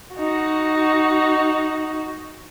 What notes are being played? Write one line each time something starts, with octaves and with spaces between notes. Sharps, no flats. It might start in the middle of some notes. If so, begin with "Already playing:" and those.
D#4 F#4